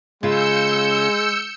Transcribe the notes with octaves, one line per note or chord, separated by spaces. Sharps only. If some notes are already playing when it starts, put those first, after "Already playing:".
C#3 G#3 F4 E6 G6 C#7